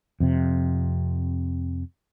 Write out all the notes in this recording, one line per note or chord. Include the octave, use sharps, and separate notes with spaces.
F2 C3